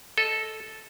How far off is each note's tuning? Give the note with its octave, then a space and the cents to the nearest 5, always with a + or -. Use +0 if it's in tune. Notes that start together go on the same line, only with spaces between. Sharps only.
A4 -5 D#5 +0